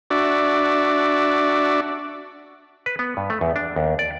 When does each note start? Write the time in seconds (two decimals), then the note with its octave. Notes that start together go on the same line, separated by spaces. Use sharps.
0.11 D4 F#4 D5 E5
2.86 B4
2.99 B3
3.17 G2
3.30 A3
3.41 E2
3.56 D4
3.76 D#2
3.99 D5